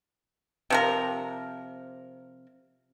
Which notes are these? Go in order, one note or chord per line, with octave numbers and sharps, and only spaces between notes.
C3 F3 A#4